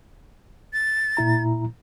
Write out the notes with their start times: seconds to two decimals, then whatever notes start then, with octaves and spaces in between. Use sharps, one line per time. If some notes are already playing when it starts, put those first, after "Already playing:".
0.73 A6
1.17 A#2 E4 A#5